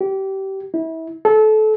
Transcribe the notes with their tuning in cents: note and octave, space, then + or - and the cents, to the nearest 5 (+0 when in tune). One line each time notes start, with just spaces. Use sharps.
G4 -25
E4 -30
A4 -25